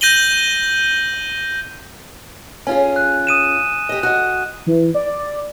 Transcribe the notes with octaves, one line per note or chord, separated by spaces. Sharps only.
G6 A#6 D#7 F#7 G7
C#4 F4 G#4 G#5
F#6
D#6 D#7 E7
G4 D#5
F#4 D#5 F#6
E3
D5